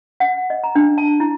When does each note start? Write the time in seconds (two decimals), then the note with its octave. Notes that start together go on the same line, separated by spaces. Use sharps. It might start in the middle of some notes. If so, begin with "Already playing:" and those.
0.20 F#5
0.50 D#5
0.64 A#5
0.75 D4
0.98 A5
1.20 E4